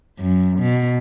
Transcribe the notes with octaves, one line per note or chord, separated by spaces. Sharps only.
F#2
B2